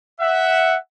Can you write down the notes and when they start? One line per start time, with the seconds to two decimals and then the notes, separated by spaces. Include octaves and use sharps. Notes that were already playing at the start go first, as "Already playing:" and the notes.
0.20 E5 F#5